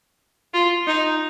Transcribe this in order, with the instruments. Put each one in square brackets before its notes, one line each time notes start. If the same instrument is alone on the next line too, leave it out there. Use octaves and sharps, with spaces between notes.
[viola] F4
D#4